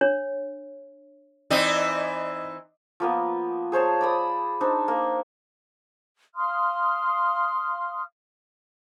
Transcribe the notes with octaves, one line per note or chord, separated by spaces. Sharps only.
D4 C#5
E3 C4 D#4 D5 D#5
F3 A#3 B3
G#4 C5 C#5 A5
D5 B5 D#6
D4 D#4 C5
A#3
F5 C6 D#6 F6